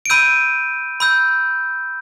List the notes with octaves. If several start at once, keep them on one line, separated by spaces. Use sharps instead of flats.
D7
B5 E6 G6 D#7
B5 E6 G6